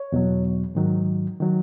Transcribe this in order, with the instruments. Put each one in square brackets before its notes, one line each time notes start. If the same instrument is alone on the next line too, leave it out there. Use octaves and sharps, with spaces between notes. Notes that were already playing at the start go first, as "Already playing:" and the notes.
Already playing: [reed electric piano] C#5
E2 B2 F#3
G#2 D#3 F#3
D#3 F#3